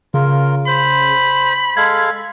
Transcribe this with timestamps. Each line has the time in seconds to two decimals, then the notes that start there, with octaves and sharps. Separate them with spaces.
0.14 C#3 F4 A#4
0.67 C5 B5
1.77 G#3 A4 F5 G#6